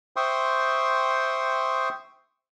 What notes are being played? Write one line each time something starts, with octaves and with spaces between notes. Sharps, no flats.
C5 E5 G5 C6 C#6 D#6